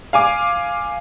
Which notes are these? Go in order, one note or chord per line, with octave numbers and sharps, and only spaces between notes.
F5 G#5 D6